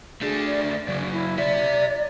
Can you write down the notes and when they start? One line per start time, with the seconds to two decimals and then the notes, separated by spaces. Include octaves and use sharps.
0.21 A3 D4 G#4
0.46 D5
0.88 C#3 F#3
1.12 E4
1.38 G4 D5 E5